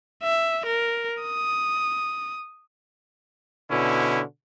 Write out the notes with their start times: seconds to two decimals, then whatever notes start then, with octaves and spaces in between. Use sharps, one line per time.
0.23 E5
0.66 A#4
1.22 D#6
3.71 B2 D3 C#4 E4